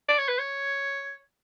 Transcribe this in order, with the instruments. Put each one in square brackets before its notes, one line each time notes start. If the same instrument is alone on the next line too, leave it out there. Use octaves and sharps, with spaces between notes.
[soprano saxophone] D5
C#5
B4
C#5